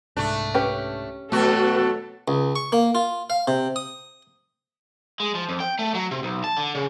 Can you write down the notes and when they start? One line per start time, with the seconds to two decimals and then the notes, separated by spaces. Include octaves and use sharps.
0.17 C2 G#2 A3 D4
0.54 C#4 G4 B4
1.32 B2 F#3 A3 F#4 A4
2.28 C#2
2.56 C#6
2.72 A#3
2.95 F4
3.30 F5
3.48 C3
3.76 D#6
5.20 G#3
5.35 F3
5.49 F2
5.60 G5
5.79 A3
5.95 F#3
6.11 C3
6.23 B1
6.44 A5
6.57 D3
6.75 C#3